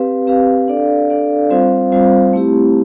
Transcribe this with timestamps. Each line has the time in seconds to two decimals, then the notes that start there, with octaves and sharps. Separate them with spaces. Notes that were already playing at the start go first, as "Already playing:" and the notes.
Already playing: C4 G4 B4 F5
0.27 C4 G4 B4 F5
0.68 D4 A4 D5 F5
1.09 D4 A4 D5 F5
1.50 G3 C4 F4 C5 F5
1.92 G3 C4 F4 C5 F5
2.33 A3 C4 E4 G4